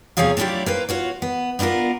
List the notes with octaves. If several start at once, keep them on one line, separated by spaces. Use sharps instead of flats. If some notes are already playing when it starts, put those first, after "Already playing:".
E2 C3 F3 G#4 C#5 F5
F#3 A3 D4 E4 F4 G4
A#3 B4 C5
F4 F#4 C#5
B3
B3 D4 E4 F4 A#4